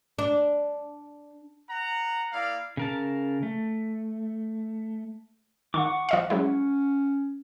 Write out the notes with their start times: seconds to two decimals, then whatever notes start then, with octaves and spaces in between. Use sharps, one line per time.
0.19 D4
1.70 F#5 A#5
2.32 A#3 E4 D5 F5
2.77 C#3 A#4 A5
3.43 A3
5.74 D#3 F#5 C#6 D6
6.09 F3 D#5 F5
6.30 F#3 G#3 C#4 E4